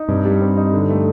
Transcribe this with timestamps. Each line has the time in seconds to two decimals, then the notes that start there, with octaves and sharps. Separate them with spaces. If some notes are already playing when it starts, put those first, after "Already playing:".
Already playing: D#4
0.08 G2 C3
0.25 G3
0.41 C4
0.57 D#4
0.73 D3
0.90 A3